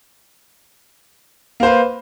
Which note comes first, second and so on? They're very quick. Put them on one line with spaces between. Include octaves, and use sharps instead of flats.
A#3 C5 B4